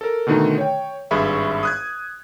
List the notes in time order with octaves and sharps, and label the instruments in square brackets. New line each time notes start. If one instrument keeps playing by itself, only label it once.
[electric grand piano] A4 A#4
B2 D3 D#3 A3 D#4
C#5 G5
G#1 G2 G#4 E5 B5 C#6
D#6 F#6 G#6